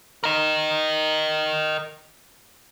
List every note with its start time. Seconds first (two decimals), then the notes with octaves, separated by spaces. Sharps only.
0.24 A#4 D#5